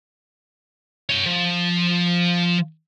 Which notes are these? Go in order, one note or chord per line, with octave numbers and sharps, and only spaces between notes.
C#5 G5
F3